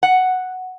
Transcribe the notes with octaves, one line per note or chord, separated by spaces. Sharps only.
F#5